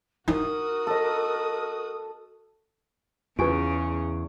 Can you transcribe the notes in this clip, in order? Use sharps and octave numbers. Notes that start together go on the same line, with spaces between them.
D#4 F#4 A#4 D#6
A4 D#5
E2 C#3 F4 G4 B4 G#5 C#6 D7